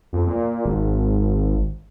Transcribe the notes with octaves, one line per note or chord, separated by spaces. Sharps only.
F2
A#2
G#1